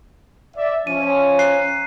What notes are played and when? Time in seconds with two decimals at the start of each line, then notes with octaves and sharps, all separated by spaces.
0.57 D5 E5
0.87 F3 C#4 D#7
1.38 A#5 F#6 C7